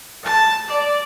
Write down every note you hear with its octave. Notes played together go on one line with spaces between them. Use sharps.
A5
D5